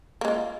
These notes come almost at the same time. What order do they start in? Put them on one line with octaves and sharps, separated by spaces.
A#3 G#3 F4